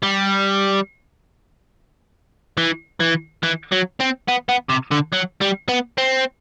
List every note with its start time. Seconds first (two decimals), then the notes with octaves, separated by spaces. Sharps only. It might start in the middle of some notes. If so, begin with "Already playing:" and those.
0.03 G3
2.57 E3
3.00 E3
3.43 E3
3.72 F#3
4.00 C4
4.28 B3
4.49 B3
4.70 C3
4.92 D3
5.13 F#3
5.42 G3
5.69 B3
5.98 C4